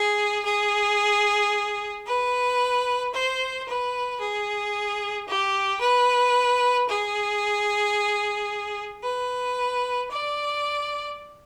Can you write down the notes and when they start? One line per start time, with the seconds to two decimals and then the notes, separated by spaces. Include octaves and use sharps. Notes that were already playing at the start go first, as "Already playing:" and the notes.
Already playing: G#4
0.45 G#4
2.06 B4
3.13 C5
3.67 B4
4.20 G#4
5.27 G4
5.80 B4
6.88 G#4
9.02 B4
10.10 D5